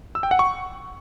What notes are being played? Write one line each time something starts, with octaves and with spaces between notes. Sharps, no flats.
E6
G5
F#5
C#6